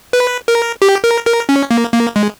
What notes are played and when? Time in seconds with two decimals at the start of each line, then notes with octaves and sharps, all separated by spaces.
0.13 B4
0.48 A#4
0.82 G4
1.04 A#4
1.26 A#4
1.49 C#4
1.71 A#3
1.93 A#3
2.16 G#3